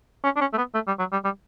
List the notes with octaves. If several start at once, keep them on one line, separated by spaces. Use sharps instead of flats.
C#4
D4
C#4
A3
B3
A3
G3
F#3
G3
G3